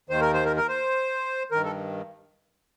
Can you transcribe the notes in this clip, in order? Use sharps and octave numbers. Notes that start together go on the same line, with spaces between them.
D#2 D#3 C5
A#4
C5
A#4
A#4
C5
G2 D#3 A#4
A4